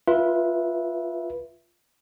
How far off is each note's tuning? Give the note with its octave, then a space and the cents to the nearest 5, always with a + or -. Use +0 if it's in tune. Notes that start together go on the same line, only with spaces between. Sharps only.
F4 +0 B4 -20 E5 +0